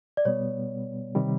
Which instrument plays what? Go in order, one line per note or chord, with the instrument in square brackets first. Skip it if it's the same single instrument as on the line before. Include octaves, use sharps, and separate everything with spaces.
[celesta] D5
[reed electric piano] B2 G3 B3 [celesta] C#5
[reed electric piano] C3 D#3 G3